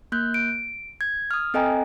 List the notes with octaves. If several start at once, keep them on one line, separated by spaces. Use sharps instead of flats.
A#3 F#6 G6
D7
G#6
D#6 F6
C4 A4 D#5 G5 G#5 A#5